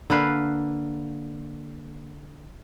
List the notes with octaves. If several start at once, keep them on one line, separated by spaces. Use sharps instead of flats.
D3 A#3 B4 F5